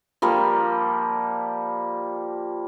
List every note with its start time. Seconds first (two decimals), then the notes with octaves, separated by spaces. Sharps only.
0.22 F3 G3 A#3